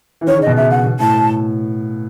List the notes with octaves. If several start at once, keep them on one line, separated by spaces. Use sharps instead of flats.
E3
D#3 C#5
C#3
B2 D#5
C#3 E5
F#5
B2
A2 A5